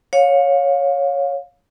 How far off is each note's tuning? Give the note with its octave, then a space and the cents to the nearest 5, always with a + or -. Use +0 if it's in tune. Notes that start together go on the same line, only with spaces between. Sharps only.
C#5 +0 F5 +25